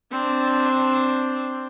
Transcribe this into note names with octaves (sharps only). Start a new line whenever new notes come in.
C4 D4